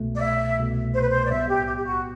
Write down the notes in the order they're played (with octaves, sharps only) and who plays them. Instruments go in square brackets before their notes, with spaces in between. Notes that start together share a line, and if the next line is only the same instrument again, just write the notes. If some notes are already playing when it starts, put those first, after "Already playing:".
Already playing: [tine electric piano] C2 B2 A3
[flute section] D5
E5
[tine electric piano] C2 B2 A3
[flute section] C5
B4
C5
D5
[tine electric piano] B1 A2 G3 B3 [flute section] E5
[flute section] G4
G4
G4
F#4